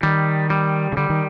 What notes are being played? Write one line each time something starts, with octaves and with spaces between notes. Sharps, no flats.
D#3 G3
G3
C#3
D3 G3
D#3